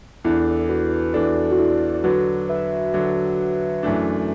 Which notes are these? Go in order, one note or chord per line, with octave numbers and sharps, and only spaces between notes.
E2 E3 D4 E4 A4
F#4 B4
E2 E3 D4 A4 D5
F#4
E4 A4
D5
D3 F#3 D4 F#4 B4
B4 E5
D3 F#3 D4
F#2 E3 A3 D4